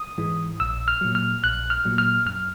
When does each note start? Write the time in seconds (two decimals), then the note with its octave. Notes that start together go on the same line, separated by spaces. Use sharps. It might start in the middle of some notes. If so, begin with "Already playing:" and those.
Already playing: D#6
0.18 G#2 E3 G#3
0.60 A#1 E6
0.88 F6
1.01 A#2 F#3
1.15 F6
1.44 A#1 F#6
1.70 F6
1.85 A#2 F#3
1.98 F6
2.26 F#2 F6